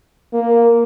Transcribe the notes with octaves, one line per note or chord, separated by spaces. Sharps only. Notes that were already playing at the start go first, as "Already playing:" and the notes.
A#3